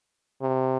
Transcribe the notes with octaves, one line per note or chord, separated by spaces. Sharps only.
C3